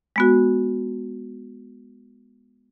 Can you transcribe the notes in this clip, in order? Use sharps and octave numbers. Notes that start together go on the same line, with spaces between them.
G#3 B3 F#4